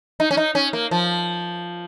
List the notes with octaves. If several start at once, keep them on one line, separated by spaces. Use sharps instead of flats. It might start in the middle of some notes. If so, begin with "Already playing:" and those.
D#4
C#4
D#4
C#4
A#3
F3